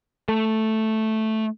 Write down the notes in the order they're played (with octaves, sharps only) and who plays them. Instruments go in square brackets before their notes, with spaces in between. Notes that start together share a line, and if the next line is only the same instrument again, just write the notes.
[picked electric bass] A3